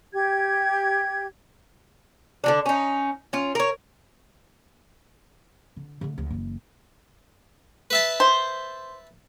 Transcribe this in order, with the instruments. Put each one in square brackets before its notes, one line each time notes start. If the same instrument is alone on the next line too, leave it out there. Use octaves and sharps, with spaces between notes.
[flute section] G4 G#6
[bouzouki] D3 F3 D4
C#4 D#4
C#4 F4
A#4 C#5
[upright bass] D3
D3 A3
D2
F#1 E3
[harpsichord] B4 E5 A5
[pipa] C5